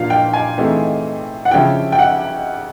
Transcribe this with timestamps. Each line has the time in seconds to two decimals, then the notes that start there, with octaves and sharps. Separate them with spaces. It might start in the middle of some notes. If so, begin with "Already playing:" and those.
Already playing: A#2 F3 A#3 D4 F5
0.10 G5
0.33 G#5
0.57 E3 A3 C4 D#4 G#4
1.45 F#5
1.51 C#3 F3 G#3 C#4 E4 G5
1.92 G5
1.99 F#5